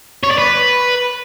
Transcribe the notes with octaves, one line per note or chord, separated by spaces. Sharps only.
C#5
D5
B4